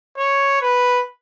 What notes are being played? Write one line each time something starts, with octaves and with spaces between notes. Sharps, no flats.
C#5
B4